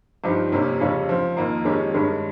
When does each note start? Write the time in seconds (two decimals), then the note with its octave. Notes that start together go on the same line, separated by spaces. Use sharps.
0.24 G2 F3 C4 D#4 G4
0.52 F2 C3 G3 A#3 C#4
0.81 F2 C#3 G3 C#4 F4
1.09 F3 C4 F4
1.37 F2 D#3 A#3
1.65 F2 D#3 G#3 C#4 G4
1.94 G2 D#3 G#3 C#4